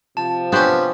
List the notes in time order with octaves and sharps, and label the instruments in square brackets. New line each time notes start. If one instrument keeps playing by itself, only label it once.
[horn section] C3 F3 [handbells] A5
[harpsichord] B3 C#4 [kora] D4 G4 C5